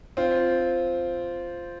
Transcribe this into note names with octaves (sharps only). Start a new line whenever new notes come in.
C4 F4